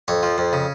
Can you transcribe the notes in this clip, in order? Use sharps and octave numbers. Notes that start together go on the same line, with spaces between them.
F2 C#5
F3
F2
C#3